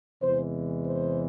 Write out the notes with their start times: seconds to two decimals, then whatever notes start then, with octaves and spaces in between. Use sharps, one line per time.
0.22 E2 C3 E3 G#3 C5
0.84 C5